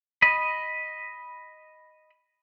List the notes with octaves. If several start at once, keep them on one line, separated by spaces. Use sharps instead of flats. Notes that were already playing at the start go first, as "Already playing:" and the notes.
D#5 B5